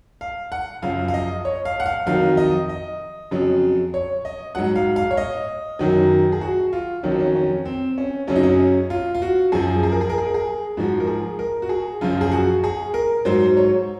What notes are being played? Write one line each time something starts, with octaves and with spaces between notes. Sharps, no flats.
F5
F#5
F#2 C#3 F3 F5
F5
D#5
C#5
F5
F#5
F5
F2 D#3 F#3 F5
D#5
D#5
F2 C#3 F#3
C#5
D#5
G#2 F#3 F#5
F5
F5
C#5
D#5
F#2 D#3 F#3
G#4
F#4
F4
F2 D#3 F#3 C#4
C4
C#4
C#4
C4
C#4
F#2 C#3 F#3 C#4
D#4
C#4
F4
F4
F#4
F#2 F3 G#4
G#4
A#4
G#4
A#4
G#4
A#4
G#4
G#2 F3 F#4
A#4
G#4
A#4
F#4
G#4
F#2 C#3 F3 F4
G#4
F#4
G#4
A#4
G#2 F#3 C5
C#5